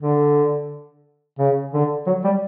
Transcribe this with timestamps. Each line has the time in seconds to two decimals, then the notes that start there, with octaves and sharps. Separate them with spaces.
0.02 D3
1.39 C#3
1.74 D3
2.07 F#3
2.24 G3